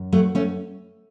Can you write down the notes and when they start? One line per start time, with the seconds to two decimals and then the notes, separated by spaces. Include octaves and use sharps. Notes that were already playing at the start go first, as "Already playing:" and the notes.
Already playing: F#2
0.12 F#3 A3
0.35 A3 C#4